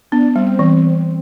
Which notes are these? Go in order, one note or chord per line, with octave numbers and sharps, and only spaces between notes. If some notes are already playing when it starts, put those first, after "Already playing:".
B3 D4
G3 C4
E3